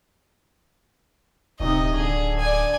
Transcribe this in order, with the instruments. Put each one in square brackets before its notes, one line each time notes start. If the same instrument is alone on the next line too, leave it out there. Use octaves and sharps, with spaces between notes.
[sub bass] D1 [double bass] C3 D#4 [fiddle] D#5
[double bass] D3 D4 [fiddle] G#4
[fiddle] D5 G#5